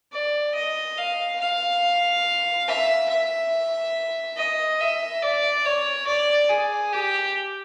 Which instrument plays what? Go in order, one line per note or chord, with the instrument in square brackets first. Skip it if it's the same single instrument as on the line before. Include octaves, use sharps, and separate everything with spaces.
[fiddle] D5
D#5
F5
F5
E5
E5
D#5
E5
D5
C#5
D5
G#4
G4